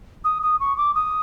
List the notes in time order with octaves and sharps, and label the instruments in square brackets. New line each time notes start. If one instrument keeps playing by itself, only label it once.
[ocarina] D#6
D#6
C#6
D6
D#6